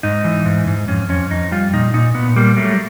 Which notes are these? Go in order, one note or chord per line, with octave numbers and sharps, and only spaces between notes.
G#2 D#4
E3
G#2
G#2
F2 C#4
F2 C#4
F2 D#4
G3 F4
A#2 D#4
A#2 D#4
A#2 B3
G3 A#3
F#3 A3